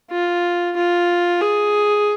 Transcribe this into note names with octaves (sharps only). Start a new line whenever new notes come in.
F4
F4
G#4